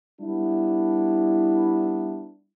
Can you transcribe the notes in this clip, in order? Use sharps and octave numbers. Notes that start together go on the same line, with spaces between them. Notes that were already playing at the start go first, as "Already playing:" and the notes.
G3 B3 D4 E4